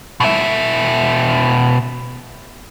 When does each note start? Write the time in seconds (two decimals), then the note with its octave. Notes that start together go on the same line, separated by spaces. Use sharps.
0.20 B2 E5